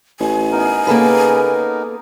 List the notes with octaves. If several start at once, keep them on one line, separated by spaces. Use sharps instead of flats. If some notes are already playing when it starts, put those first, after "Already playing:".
A1 G#5
B3 D#4 A#4
C#3 A#3 A4 B4